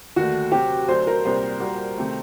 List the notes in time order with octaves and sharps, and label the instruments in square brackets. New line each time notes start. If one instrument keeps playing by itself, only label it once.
[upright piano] D#2 D3 A3 [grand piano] F#4
[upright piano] C3 F#3 C4 [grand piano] G4
[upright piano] D2 D3 F#3 A3 [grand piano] C5
[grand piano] A#4
[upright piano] C2 A#2 G3 [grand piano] C5
[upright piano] A#2 G3 A#3 F#4
C3 D#3 A3